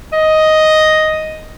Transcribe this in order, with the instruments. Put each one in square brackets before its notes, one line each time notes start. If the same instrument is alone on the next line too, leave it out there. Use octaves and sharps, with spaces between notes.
[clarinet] D#5